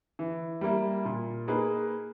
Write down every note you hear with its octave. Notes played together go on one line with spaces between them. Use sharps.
E3
G3 A#3 E4
A#2
A#3 D#4 G#4 B4